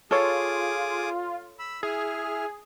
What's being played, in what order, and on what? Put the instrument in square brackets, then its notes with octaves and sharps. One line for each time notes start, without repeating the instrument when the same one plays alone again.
[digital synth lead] F4 [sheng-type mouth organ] G#4 D6 D#6 [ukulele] A4 C#5
[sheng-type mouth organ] B5 E6
[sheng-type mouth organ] E4 F6 [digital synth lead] G#4